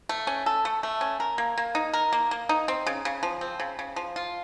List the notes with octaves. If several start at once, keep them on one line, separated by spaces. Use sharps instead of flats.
A3
C#4
A4
A3
A3
C#4
A#4
A#3
A#3
D#4
A#4
A#3
A#3
D#4
C4
C#3
C#3
F3
C4
C#3
C#3
F3
F4